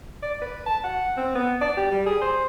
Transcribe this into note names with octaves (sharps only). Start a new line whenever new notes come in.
D5
B4
A5
F#5
C4
B3
D5
G4
G3
G#4
C5